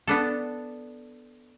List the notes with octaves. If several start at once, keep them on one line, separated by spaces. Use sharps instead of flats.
B3 D4 A4